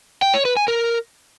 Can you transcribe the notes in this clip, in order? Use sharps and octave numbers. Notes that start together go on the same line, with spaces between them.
G5
C#5
B4
G#5
A#4